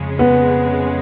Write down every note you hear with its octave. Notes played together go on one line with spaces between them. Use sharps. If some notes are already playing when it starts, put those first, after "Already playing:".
Already playing: F2 C#3 G#3
B3